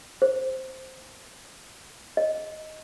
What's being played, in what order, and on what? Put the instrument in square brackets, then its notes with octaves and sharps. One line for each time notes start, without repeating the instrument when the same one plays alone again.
[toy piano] C5
D#5